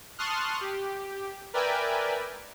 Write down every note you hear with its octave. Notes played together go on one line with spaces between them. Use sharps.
A5 C6 C#6 D#6 F6 F#6
G4
A#4 B4 D5 E5 G5 G#5